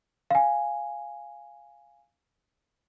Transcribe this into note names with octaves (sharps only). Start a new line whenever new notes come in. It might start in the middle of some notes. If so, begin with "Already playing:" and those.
F5 G#5